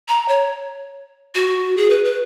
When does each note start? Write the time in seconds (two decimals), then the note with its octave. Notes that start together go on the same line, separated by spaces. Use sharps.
0.08 A#5
0.28 C#5
1.35 F#4
1.77 G#4
1.90 B4
2.05 B4